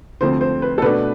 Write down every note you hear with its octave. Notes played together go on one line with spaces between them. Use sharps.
D2 C3 F3 A3 C4 C5
C5
B4
A4
B2 A3 D4 B4